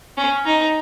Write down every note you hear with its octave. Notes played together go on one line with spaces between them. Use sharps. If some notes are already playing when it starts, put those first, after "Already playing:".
C#4
D#4